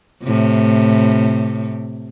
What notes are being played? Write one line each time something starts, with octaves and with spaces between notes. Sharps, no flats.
A2 C3